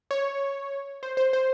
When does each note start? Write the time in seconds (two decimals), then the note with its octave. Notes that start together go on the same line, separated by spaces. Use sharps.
0.11 C#5
1.03 C5
1.17 C5
1.33 C5